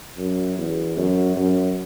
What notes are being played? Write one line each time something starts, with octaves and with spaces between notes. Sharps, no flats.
F#2
E2
F#2
F#2